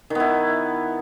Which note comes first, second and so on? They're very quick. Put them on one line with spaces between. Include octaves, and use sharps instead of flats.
D#3 B3 E4